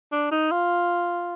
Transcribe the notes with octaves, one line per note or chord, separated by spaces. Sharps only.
D4
D#4
F4